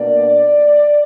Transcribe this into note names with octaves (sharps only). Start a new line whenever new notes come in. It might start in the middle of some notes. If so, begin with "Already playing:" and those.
Already playing: B2 A#3 D4 D5